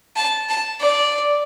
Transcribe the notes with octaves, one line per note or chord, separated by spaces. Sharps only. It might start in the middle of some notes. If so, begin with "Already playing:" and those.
A5
A5
D5